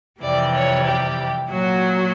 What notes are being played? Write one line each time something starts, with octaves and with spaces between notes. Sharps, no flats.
F2 C3 E3 G3 D5
C#5
G4
A#2 F#3 F#4